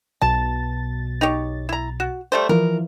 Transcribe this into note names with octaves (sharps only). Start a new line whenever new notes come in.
B1 B2 A5 A6
D#4 G4 C#5
E4 A#5
F#4
G3 A3 C5
E3 F3 A#4